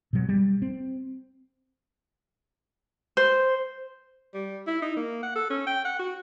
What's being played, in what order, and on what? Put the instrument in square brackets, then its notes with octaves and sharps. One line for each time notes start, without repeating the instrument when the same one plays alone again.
[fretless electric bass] B2 F#3
G3
C4
[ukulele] C5
[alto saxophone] G3
E4
D#4
A#3
F#5
A4
C#4
G5
F#5
F#4